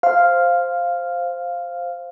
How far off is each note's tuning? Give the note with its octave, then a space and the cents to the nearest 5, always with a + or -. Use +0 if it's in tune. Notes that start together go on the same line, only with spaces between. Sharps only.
C5 +5 F5 +0